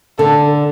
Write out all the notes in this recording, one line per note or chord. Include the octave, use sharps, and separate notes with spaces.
D3 A4